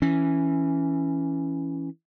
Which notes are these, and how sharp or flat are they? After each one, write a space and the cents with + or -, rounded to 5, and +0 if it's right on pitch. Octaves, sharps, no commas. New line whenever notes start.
E3 +0 C#4 +0